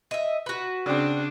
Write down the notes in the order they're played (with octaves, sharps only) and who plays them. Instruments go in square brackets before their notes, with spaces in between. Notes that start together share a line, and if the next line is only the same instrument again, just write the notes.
[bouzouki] D#5 E5
F#4 B4
[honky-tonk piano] C#3 C4 [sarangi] D4